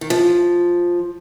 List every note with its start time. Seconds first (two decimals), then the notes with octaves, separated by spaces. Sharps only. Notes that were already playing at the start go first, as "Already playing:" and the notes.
0.01 D#3
0.10 F3